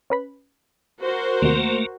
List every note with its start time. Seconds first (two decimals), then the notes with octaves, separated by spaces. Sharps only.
0.10 C#4 B4 B5
1.01 F#4 A#4 C5
1.42 D#2 C3 A3 A#3